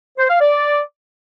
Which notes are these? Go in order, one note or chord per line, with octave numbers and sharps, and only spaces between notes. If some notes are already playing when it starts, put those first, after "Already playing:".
C5
F5
D5